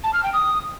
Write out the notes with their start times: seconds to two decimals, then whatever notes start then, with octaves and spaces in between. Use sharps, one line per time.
0.04 A5
0.14 F6
0.23 G5
0.33 D#6